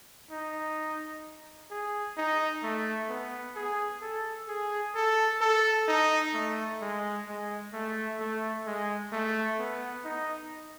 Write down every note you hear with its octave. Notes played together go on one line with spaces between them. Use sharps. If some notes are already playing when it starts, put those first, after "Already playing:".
D#4
G#4
D#4
A3
B3
G#4
A4
G#4
A4
A4
D#4
A3
G#3
G#3
A3
A3
G#3
A3
B3
D#4